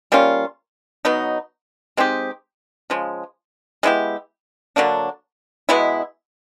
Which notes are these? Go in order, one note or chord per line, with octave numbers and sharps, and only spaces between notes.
G3 A#3 C#4 F4
B2 F#3 B3 D#4
G#3 C4 D#4 G4
C#3 F3 G#3
G#3 B3 E4 G4
D3 F#3 A#3 D4
B2 G#3 B3 E4